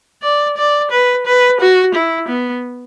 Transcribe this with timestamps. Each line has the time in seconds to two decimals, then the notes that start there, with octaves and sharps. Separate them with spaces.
0.23 D5
0.57 D5
0.91 B4
1.26 B4
1.60 F#4
1.94 E4
2.28 B3